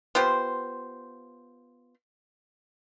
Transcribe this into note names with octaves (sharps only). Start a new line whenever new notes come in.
B3 F4 G4 C5